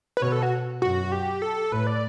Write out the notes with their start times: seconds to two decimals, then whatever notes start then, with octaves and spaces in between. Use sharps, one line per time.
0.17 B4
0.22 B2 C#5
0.32 A4
0.43 F#4
0.82 F#2 F#4
1.12 G4
1.42 A4
1.72 A2 B4
1.87 D5